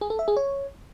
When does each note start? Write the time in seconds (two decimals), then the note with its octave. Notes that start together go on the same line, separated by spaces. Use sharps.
0.01 G#4
0.10 A4
0.19 E5
0.28 G#4
0.37 C#5